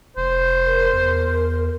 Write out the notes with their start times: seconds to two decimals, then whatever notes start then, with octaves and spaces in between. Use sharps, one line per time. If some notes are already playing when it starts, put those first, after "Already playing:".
0.17 F1 C5
0.66 A#4
0.93 E2